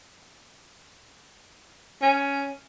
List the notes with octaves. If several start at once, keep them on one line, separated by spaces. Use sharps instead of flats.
C#4